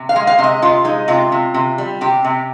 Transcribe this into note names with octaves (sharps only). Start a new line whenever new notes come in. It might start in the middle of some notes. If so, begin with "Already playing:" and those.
Already playing: C3
F5
G#3
F5
C3
D#5
C3 F4
G#3 D#4
C3 F4
C3
C3
G3
C3 G4
C3